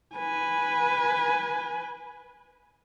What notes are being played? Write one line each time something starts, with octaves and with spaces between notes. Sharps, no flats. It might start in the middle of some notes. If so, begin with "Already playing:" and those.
B4 G#5